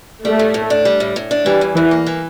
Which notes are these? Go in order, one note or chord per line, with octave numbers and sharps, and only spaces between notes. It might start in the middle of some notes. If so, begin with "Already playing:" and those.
G3 A3
A2
A2
D4
G3
A2
A2
D4
E3 G3
E2
E2 E3
A#3
E3